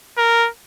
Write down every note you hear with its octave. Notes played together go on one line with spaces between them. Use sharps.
A#4